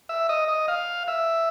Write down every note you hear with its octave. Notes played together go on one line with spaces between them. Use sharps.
E5
D#5
D#5
F5
E5